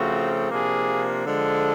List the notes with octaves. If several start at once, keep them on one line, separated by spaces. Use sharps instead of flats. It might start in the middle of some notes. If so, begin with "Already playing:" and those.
Already playing: C#3 F3 A3 C4 F#4
C3 F3 A#3 D4 G#4
D3 F3 G#3 A4